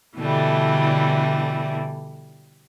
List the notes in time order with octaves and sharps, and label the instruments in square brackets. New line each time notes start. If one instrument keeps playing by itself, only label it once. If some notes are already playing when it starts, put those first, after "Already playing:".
[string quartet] B2 D3 E3 G3 A3